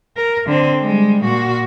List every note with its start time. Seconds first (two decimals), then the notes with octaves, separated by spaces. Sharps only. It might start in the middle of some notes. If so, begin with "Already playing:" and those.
0.17 A#4
0.46 D3 C4
0.81 G3 G#3
1.25 A#2 F#4